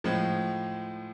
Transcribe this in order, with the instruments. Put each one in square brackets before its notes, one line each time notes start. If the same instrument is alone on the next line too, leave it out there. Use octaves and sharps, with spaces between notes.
[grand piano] A2 F3 G#3